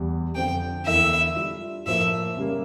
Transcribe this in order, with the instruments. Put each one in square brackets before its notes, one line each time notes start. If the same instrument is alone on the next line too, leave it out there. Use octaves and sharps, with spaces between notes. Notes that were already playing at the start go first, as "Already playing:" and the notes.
Already playing: [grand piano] E2 G3
[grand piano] F2 D3 F3 [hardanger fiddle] G5
[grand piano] E2 D3 A3 E4 A#4 [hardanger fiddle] E5
[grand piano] G3 D4 F4
[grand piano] A2 F3 A#3 [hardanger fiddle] E5
[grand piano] C#3 G3 A#3